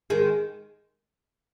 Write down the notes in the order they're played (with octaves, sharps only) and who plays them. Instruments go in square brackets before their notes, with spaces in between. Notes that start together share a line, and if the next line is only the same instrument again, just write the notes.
[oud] D#3 G#3